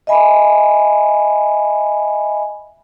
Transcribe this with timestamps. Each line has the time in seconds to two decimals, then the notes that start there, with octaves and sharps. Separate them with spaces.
0.07 D#5 E5 G#5 B5